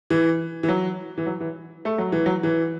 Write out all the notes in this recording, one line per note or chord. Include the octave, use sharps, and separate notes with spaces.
E3
E3
F#3
E3
F#3
E3
A3
F#3
E3
F#3
E3